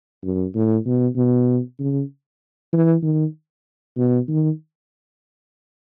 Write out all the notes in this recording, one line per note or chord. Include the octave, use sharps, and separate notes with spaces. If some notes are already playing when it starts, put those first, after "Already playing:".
F#2
A2
B2
B2
C#3
E3
D#3
B2
D#3